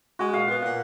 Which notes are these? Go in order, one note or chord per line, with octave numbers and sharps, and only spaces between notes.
G#3 F#4
A#2 F5
B3 F#5
A#2 F#5